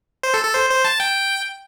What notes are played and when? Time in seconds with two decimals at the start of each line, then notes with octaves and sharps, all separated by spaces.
0.23 C5
0.34 A4
0.44 A4
0.54 C5
0.70 C5
0.85 A5
1.00 G5